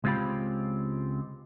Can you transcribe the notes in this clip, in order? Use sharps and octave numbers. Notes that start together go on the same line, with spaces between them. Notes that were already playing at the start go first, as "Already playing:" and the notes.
C#2 G#3 C4 F4 G4 B5